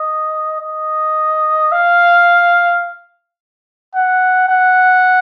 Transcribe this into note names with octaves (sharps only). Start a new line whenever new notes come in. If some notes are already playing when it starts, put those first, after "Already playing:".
Already playing: D#5
D#5
F5
F#5
F#5